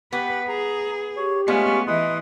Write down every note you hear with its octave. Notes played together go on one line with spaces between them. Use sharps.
B3 G4 B4
G#4 A#5
G4 C#5
G#3 A3 B3 C#4 F4 C#6
E3 B4 D#5 C6 D#6